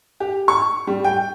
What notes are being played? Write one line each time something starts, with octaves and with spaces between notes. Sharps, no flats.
G4
C#6
G3
G5